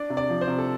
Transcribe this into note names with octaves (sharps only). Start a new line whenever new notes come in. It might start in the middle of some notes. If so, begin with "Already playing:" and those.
Already playing: D4 D5
C3
D5
F3
C5
C3
A4